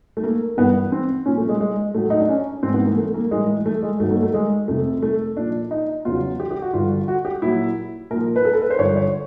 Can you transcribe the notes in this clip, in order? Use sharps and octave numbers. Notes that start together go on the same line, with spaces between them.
A3
A#3
G2 E3 B3
C4
A#2 F3 C#4
A3
G#3
G#3
A2 F#3 A3
D#4
D4
C#4
G#2 E3 C4
B3
A#3
A3
A#3
A2 E3 G#3
A3
G#3
G2 D#3 F#3 A3
A#3
A3
G#3
F2 C3 F3 A3
A3
A#2 F3 D4
D#4
E2 C#3 F#3 F4
G4
G4
F#4
G2 D3 F3 F4
F#4
G4
A#2 F#3 E4
A#2 F3 A#4
B4
A4
A#4
B4
C5
G2 D3 F3 C#5
C#5